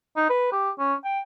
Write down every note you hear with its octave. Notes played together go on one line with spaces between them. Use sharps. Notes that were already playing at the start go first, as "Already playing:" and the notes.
D#4
B4
G4
C#4
G5